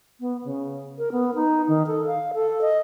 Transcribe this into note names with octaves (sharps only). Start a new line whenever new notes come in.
B3
C#3
A#4
B3
D#4
D#3
A4
F5
A4
D#5